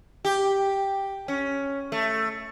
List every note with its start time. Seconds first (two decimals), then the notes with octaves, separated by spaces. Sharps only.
0.25 G4
1.28 C#4
1.92 A3